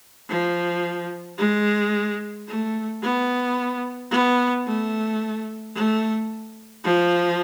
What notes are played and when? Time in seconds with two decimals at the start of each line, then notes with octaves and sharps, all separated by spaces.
0.29 F3
1.38 G#3
2.47 A3
3.02 B3
4.11 B3
4.65 A3
5.75 A3
6.84 F3